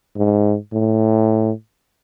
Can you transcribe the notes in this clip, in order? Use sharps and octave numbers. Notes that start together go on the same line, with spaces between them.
G#2
A2